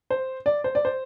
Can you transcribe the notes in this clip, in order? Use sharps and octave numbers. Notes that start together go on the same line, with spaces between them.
C5
D5
C5
D5
C5